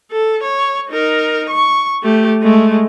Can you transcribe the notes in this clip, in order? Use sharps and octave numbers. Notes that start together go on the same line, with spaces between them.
A4
C#5
D#4 A#4
C#6
A3 G4
G#3 A3